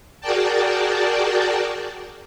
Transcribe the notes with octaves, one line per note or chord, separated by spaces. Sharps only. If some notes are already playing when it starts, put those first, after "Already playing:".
F#4 G#4 A#4 D5 G5 A5